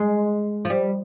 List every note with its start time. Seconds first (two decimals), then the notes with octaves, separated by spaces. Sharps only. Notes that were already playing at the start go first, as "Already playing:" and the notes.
Already playing: G#3
0.65 F3
0.70 G3